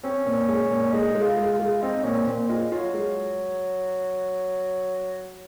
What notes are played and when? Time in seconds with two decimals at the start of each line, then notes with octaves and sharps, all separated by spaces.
0.03 C4 C#4
0.26 A#2
0.48 G#3
0.71 A#2
0.93 G#3 D#4
1.15 G#3
1.22 F4
1.37 G#3
1.53 F4
1.60 G#3
1.82 C4 D#4
2.04 A#2 C#4
2.27 A#2 C4
2.48 G#3 F4
2.72 F#3 F4
2.94 G#3